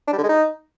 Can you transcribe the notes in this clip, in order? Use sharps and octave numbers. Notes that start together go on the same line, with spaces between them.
D4
G3
D3
G#3
D#4